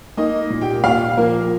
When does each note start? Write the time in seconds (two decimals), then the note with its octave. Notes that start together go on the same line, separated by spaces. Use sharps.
0.17 A#3 D#4 D#5
0.50 A#2
0.61 G4 G5
0.84 A#2 F4 F5
1.17 F3 A#3 A#4